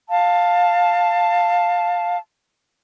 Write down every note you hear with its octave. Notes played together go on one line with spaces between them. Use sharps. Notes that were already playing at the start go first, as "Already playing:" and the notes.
F5 A5